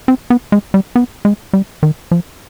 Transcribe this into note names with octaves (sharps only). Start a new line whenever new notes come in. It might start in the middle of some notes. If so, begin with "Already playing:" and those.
C4
B3
G#3
G3
B3
G#3
G3
D#3
F3